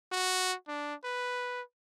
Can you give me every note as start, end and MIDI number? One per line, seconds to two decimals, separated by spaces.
0.12 0.54 66
0.68 0.95 62
1.04 1.62 71